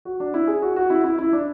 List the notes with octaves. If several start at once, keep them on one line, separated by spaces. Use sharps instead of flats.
F#4
D4
E4
G#4
F#4
F#4
E4
E4
E4
D4